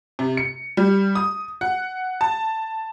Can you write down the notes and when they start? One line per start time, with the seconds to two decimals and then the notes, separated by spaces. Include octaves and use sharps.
0.19 C3
0.37 C#7
0.77 G3
1.15 D#6
1.61 F#5
2.21 A5